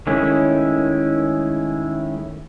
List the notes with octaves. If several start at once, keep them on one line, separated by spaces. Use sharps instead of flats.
D#3 G#3 A3 C#4 E4